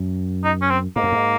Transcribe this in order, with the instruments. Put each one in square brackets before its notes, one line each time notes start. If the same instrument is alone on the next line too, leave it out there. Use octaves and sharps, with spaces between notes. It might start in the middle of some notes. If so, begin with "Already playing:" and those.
Already playing: [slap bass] F#2
[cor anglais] D#4
C#4
C4
[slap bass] G#2 [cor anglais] A#3
[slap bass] F#2
G#2